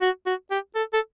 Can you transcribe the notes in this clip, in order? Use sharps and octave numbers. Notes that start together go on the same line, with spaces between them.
F#4
F#4
G4
A4
A4